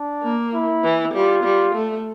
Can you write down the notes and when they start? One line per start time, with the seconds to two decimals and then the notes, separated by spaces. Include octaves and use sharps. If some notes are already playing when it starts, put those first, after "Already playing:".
Already playing: D4
0.23 A#3
0.54 E4
0.84 E3
1.14 G3 F4
1.44 G3
1.75 A3